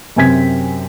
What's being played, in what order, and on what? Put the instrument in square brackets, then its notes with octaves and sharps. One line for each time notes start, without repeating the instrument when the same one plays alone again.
[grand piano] F#2 C3 C4 G#5 G#6 B6